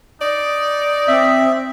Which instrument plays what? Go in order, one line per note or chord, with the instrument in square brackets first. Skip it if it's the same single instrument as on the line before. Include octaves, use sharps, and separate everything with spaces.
[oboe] D#4 [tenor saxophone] D5
[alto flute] C4 [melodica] E5